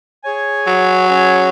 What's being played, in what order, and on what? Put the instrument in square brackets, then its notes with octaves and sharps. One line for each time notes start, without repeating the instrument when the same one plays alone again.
[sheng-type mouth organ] G#4 C#5 G#5
[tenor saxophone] F#3
[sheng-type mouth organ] C#4 G#4 C#5 G#5